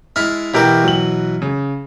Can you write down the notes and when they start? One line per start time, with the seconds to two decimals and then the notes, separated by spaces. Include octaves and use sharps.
0.16 G#3 E4 A5 F6
0.54 B2 E3 E4 F#4 G4 A#4
0.84 F#3 F#7
1.42 C#3